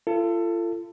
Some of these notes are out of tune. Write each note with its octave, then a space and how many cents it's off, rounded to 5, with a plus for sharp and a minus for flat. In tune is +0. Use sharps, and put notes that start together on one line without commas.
F4 -35 A4 +20